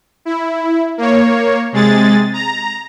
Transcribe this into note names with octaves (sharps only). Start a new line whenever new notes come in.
E4
A#3 C#5
C3 G#3 G#4 A6
A#5